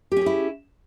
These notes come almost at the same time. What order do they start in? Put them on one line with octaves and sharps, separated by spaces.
G4 C#4 G#4 E4